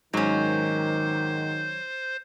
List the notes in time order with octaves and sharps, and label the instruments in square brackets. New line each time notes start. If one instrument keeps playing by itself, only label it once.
[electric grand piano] G#2 [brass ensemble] D#3 [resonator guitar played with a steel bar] F#3 C#4 [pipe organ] C5